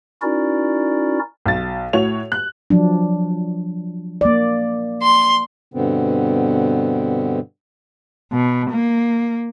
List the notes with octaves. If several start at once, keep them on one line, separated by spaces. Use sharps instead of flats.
C#4 D#4 E4 F#4 A#4 D5
B1 A6
A2 F#4 C#5 F7
F#6
F3 F#3 D4
A#3 D5
C6
G2 B2 D3 B3 C4
B2
A#3